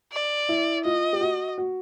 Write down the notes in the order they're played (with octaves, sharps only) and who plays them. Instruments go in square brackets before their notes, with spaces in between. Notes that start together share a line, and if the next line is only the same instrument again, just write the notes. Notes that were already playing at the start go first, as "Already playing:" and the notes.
[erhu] D5
[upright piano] E4
[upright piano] F4 [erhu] D#5
[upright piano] G4
F#4
F#4